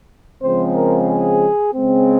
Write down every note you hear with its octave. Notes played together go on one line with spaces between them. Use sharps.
C#3 F3 G#3 C4 C5
A#4
G#4
C#3 G#3 C4